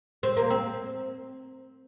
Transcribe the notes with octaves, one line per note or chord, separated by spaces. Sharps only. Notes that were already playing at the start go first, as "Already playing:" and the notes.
C4
A#3
C4